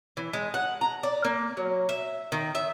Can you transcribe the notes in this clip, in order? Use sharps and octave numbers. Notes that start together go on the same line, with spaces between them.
E3
G#3
F#5
A#5
D5
A#3
F#3
E5
D#3
E5